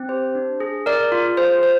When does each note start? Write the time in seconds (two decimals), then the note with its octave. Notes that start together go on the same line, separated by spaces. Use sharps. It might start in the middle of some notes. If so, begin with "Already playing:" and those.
Already playing: C4
0.09 G4 C5
0.35 D4
0.60 G#4
0.86 G#4 A#4 D5
1.12 F4
1.37 G#4 C5
1.63 F4 C5